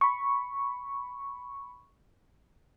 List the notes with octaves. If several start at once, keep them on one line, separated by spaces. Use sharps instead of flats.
B5 C#6